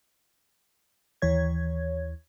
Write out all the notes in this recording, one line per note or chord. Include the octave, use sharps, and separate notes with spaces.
D#2 E3 C#5 G#6